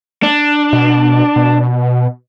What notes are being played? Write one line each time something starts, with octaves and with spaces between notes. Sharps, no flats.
D4
B2
B2